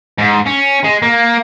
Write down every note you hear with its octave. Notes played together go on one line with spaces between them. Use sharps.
G#2
C#4
G#3
A#3